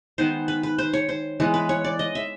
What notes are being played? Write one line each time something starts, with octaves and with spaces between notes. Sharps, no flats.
D#3 G#3 B3 C5
B4
B4
C5
C#5
C5
E3 G#3 B3
B4
C#5
D5
D#5
E5